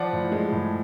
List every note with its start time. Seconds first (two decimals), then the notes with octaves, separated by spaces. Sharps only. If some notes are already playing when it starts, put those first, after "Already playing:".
Already playing: F3 D5 F#5
0.13 A2
0.32 G#3
0.52 A2